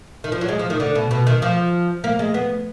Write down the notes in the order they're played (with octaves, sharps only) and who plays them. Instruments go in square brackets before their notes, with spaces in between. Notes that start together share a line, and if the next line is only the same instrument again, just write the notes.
[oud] D#3
F3
F#3
G#3
F3
D#3
D3
B2
B2
D#3
F3
A#3
G#3
B3